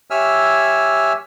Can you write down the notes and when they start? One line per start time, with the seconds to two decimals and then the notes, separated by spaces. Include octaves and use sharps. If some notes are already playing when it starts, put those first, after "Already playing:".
0.10 G4 C#5 E5 G#5 E6 F6